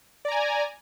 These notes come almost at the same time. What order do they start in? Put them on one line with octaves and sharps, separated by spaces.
D5 A#5 G#5